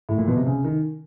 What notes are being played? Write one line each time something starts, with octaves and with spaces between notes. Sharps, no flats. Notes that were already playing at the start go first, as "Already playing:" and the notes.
A2
A#2
B2
C3
C#3
D#3